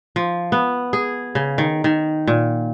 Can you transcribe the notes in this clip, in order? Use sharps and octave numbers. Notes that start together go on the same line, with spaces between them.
F3
B3
G#4
C#3
D#3
D#3
A#2